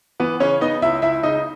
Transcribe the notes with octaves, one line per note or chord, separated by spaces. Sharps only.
E3 B3 B4
C#3 C#4 C#5
B3 D#4 D#5
C#2 E4 E5
C#2 E4 E5
C#3 D#4 D#5